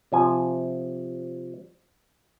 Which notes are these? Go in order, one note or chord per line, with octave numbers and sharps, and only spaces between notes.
C3 F3 G#5